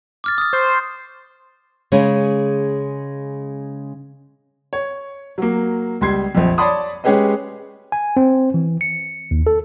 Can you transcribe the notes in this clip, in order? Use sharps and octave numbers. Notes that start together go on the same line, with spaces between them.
D6 F6 A6
D#6 A6
C5 C#6
C#3 G#3 C#4
C#5
F#3 A#3
C#2 G3 C6 G#6 C7
A#1 F2
C#5 D5 A5 B5 C6 D#6
G#3 C#4 G4 G#4 B4 D#5
G#5
C4
E3
C#7
D#2
A4